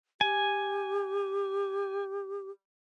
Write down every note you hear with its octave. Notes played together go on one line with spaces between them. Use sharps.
G4 G#5